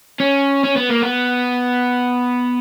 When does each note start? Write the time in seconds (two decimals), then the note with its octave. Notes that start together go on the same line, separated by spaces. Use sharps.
0.20 C#4
0.65 C#4
0.77 B3
0.90 A#3
1.02 B3